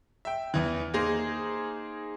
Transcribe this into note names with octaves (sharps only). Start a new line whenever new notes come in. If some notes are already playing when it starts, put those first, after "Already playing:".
E5 G5
E2 E3
A#3 D#4 G#4 C5